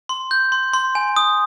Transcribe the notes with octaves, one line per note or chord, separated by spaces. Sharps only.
C6
G6
C6
C6
G#5
D#6